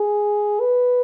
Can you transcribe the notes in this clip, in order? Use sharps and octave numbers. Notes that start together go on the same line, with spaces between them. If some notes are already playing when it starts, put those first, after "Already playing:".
Already playing: G#4
B4